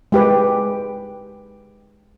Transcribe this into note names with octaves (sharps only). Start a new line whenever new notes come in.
G#3 G4 B4